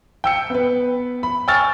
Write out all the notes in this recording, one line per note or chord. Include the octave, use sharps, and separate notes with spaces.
G5 E6 C#7
B3 B4
B5
G5 G#5 C#6 E6 F6 A6